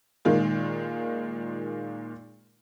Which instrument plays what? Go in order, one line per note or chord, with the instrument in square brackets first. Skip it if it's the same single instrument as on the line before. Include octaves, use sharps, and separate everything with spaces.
[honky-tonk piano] A#2 D#3 G#3 F4